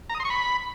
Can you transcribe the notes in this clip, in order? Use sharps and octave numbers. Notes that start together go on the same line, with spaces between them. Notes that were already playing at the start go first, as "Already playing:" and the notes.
A#5
D#6
C6
C#6
B5